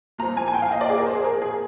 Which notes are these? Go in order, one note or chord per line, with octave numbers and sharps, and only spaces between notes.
A#2 F3 A#5
G#5
G#5
G5
F5
D#5
D5
G#4
A#4
C5
G#4
A#4
G#4